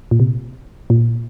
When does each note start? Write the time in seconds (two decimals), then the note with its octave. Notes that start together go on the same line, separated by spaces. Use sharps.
0.11 A#2
0.20 C3
0.90 A#2